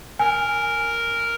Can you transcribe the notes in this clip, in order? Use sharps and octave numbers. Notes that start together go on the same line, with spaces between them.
A#4 G#5